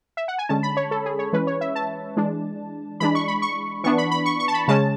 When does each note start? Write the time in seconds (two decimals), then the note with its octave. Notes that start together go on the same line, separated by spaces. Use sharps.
0.17 E5
0.28 F#5
0.38 G#5
0.49 D3 G#3 C#4 A5
0.63 B5
0.77 C#5
0.91 A4
1.05 G#4
1.19 C#5
1.33 E3 G#3 C#4 B4
1.47 C#5
1.61 E5
1.75 A5
2.17 E3 G#3 D4
3.00 E3 G#3 D4 B5
3.15 C#6
3.28 B5
3.42 C#6
3.84 E3 B3 D4 C#6
3.98 B5
4.12 B5
4.26 C#6
4.40 C#6
4.48 A5
4.54 B5
4.68 C#3 G#3 C#4 A5